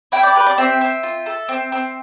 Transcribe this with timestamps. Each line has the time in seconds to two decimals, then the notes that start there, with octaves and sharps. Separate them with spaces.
0.12 E4 G5
0.23 D5
0.35 G4 B4
0.46 D5
0.58 C4 E5
0.81 C4
1.03 F4
1.26 A4
1.49 C4
1.72 C4